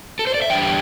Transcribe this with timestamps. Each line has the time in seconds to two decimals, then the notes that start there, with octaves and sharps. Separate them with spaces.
0.19 A4
0.27 C5
0.34 D5
0.42 E5
0.50 E2 D3 G3 D4 G5